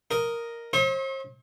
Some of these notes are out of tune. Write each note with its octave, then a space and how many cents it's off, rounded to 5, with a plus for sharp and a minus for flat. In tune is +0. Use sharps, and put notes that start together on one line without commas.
A#4 +0 D#5 +0
C5 +40 E5 -45 C#6 -45